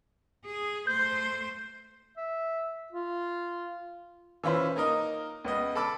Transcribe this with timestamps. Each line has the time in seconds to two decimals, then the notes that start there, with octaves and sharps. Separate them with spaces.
0.45 G#4
0.87 A3 C5 G6
2.17 E5
2.93 F4
4.44 E3 C#4 F4 B4 C5
4.76 A#3 D#4 A#4 D#5
5.44 C#2 B3 D#5
5.75 A4 B5 D6 E6